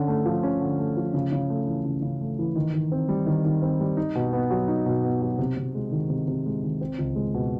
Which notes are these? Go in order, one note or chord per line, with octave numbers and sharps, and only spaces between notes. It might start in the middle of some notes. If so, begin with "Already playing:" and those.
Already playing: D3 C#4
A3
F3
C#4
D3
A3
F3
C#3
C#3
A3
E3
C#3
C#3
A3
E3
D#3
D#3
C4
G3
D#3
D#3
C4
G3
D#4
B2
B3
F#3
D#4
B2
B3
F#3
C3
C3
G#3
D#3
C3
C3
G#3
D#3
C4
C#2
G#3
B2